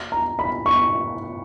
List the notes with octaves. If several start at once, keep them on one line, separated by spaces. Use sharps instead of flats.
A#5
B5
C#6